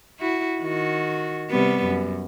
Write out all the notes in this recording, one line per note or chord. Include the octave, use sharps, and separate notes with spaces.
E4 F#4
D#3 F#4
C3 G3 B3
F#2